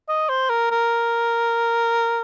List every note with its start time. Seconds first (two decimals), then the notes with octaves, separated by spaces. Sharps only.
0.09 D#5
0.29 C5
0.50 A#4
0.71 A#4